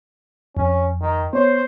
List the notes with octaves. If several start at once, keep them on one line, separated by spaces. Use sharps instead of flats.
F2 C#4
D#3
B3 C5 C#5